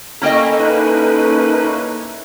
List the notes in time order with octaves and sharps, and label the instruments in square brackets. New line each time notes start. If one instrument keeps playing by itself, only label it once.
[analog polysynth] A#3 C#4 E4 [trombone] A4 [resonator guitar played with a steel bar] D#5 G5 A#5
[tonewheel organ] D#4 B4